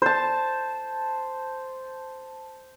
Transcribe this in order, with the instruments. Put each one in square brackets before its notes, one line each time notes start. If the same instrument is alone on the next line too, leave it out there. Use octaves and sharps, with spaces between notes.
[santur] C5 A5